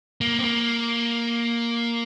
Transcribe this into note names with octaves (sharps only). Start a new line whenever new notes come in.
A#3
C4
A#3